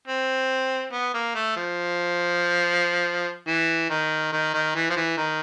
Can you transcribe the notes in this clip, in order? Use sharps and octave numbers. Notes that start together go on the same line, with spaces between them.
C4
B3
A#3
A3
F3
E3
D#3
D#3
D#3
E3
F3
E3
D#3